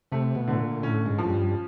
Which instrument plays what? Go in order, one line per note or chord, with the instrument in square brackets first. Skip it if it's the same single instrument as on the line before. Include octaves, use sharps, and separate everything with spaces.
[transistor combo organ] C3 [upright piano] A3
[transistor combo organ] B2
[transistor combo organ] A2 [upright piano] D3
[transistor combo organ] A#2
[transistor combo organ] A2 [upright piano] C#4
[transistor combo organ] G#2
[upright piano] F3
[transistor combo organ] G#2
G2